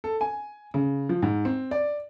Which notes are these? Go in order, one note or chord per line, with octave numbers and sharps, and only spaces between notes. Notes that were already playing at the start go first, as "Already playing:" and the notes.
A4
G#5
C#3
F3
G#2
C4
D5